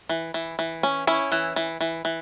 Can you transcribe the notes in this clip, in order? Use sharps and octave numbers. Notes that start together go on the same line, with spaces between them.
E3
E3
E3
C#4
C#4 E4
E3
E3
E3
E3